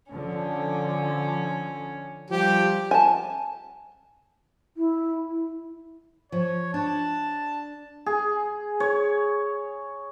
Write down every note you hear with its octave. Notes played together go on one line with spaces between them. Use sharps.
D3 F3 C#4
F3 G3 G4
G#5 A5
E4
E4
F3 C#5
D4 A5
G#4
C#5